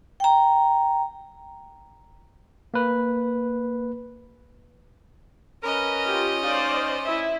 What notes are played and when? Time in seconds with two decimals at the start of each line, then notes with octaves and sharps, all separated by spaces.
0.20 G5 A#5
2.74 A#3 B4
5.63 C#4 A#4 B4 D#5
6.05 F4 G4
6.43 D#4 C5 D5 F5
7.06 E4 E5